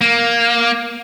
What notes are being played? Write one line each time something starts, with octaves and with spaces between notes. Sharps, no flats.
A#3